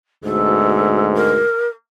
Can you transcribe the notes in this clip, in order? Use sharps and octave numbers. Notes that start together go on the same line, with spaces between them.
D2 G#2 B2 A4
A#4